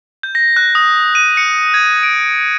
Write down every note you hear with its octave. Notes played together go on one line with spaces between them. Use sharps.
G6
A#6
F#6
D#6
D#7
C#7
G#6
D7